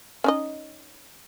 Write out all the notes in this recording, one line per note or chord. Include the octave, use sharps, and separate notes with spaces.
C#4 D#4 D#5